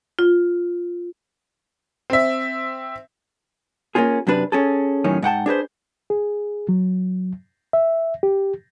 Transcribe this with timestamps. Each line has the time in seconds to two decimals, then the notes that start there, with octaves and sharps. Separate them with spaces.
0.19 F4
2.10 C4 E5
3.95 A#3 C4 C#4 F4 G#4
4.27 F#2 C3 D4 B4
4.52 C#4 G#4 A4
5.04 F#2 A2 D#3 C#4
5.22 G#2 F#5 G5 A5
5.46 D4 G#4 B4 C5
6.10 G#4
6.69 F#3
7.73 E5
8.23 G4